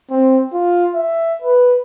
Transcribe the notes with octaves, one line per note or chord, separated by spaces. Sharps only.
C4
F4
E5
B4